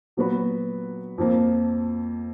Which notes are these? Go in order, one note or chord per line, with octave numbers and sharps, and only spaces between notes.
A#2 F#3 B3 F#4 B4
F2 F3 A#3